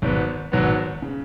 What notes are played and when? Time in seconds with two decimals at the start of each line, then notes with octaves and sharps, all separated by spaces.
0.02 G#1 G#2 F#3 B3
0.52 G#1 G#2 F#3 B3
1.02 C#3